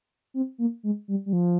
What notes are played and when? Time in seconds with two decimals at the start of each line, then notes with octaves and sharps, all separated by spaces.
0.34 C4
0.58 A#3
0.83 G#3
1.08 G3
1.26 G3
1.33 F3